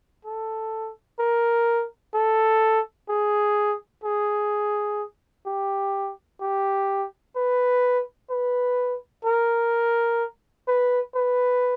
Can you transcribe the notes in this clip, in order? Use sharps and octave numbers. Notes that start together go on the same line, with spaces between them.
A4
A#4
A4
G#4
G#4
G4
G4
B4
B4
A#4
B4
B4